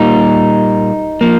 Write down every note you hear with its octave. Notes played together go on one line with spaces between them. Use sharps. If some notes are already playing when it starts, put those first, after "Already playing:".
Already playing: A#2 G3 A#3 D#4
F3 A#3